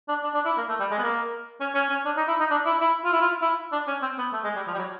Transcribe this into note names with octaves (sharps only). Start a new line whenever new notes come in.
D4
D4
D4
E4
A#3
A3
G3
G#3
B3
A#3
C#4
C#4
C#4
D4
D#4
E4
D#4
D4
E4
E4
F4
E4
F4
E4
D4
C#4
C4
B3
A3
G#3
G3
F3
G3
F#3